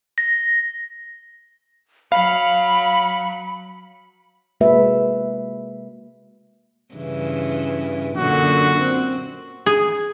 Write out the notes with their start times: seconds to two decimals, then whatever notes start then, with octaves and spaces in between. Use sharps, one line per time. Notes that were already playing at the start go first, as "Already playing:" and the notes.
0.18 A#6
2.12 F#3 F5 B5
4.61 C3 G#3 A#3 F#4 B4 E5
6.94 G2 C#3 E3
8.17 F#2 A#2 D3 F#4
8.81 C4
9.66 G#4